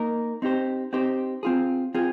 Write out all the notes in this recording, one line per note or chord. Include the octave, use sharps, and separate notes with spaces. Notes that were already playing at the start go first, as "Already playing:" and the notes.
Already playing: A#3 D#4 A#4
C4 D#4 G4 C5
C4 D#4 G4 C5
C4 F4 G#4
C4 F4 G#4